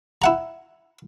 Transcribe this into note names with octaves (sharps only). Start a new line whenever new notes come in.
E4 F#5 A#5